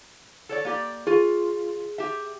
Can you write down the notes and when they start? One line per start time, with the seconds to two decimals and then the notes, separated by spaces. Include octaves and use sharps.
0.49 A4 C#5 D5
0.65 A#3 G4 D5
1.07 F4 G#4
1.98 G4 E5